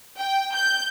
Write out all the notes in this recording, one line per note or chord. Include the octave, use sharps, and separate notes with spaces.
G5
G6